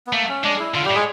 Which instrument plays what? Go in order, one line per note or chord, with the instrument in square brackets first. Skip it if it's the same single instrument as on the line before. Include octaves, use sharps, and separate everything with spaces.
[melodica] B3
[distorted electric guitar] A3 [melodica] A#3
[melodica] C#4
[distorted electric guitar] G#3 [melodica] D4
[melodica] E4
[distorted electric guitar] D3 [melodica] F4
[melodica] G3 G4
[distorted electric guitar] A2
[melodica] G#3 G#4